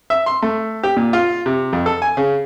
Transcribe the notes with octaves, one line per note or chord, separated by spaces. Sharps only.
E5
C6
A3
G4
A#2
F4
C3
F2
A4
G#5
C#3